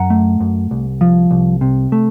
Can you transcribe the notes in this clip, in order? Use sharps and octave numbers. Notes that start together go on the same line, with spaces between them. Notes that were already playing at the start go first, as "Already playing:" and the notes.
Already playing: F#2 F#5 A#5
A3
F#2
C2
F3
C2
C3
A3